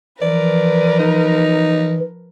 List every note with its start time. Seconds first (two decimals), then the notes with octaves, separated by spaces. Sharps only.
0.22 E3 F3 A#4 B4 D5
0.99 D#4